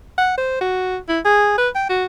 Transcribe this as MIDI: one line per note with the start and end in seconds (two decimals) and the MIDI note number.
0.18 0.35 78
0.37 0.60 72
0.61 0.98 66
1.09 1.19 64
1.25 1.53 68
1.58 1.69 71
1.75 1.87 79
1.89 2.05 66